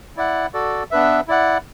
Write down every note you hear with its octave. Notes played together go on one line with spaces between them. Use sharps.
E4 D5 F#5
F#4 A4 D5
B3 D4 B4 E5
E4 D5 F#5